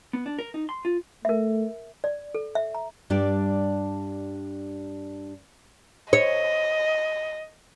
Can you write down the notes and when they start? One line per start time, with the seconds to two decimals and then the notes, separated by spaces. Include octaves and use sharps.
0.13 B3
0.26 D4
0.39 A#4
0.54 D#4
0.69 C6
0.85 F4
1.25 A3 A#4 E5
2.04 D5
2.35 A4
2.55 E5
2.75 A#5
3.10 G2 G3 D4 G4 D5
6.13 C#5 D#5